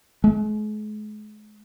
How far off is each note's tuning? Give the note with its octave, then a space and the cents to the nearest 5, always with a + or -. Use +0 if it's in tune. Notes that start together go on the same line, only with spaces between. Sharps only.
G#3 +40